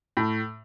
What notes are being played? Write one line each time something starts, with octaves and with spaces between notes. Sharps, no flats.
A2